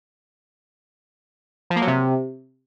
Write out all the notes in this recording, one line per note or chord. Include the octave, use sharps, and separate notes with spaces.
F3
A#3
F#3
C3